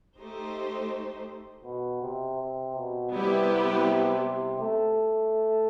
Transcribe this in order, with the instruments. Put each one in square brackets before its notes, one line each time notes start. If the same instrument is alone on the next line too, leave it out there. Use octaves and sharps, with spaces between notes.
[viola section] A3 D#4 G4 C5
[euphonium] B2
C3
C3
B2
[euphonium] C3 [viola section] G3 B3 E4 G4 B4
[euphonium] A3